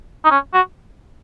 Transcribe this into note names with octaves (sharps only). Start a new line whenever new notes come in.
D#4
C#4
F#4